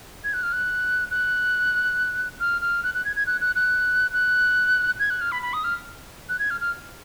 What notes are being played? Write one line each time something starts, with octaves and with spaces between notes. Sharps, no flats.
G#6
F#6
F6
F#6
F#6
F6
F6
F#6
F#6
G#6
G#6
F#6
F#6
F#6
F#6
G#6
F#6
F6
B5
B5
D#6
F6
F#6
G#6
F6
F6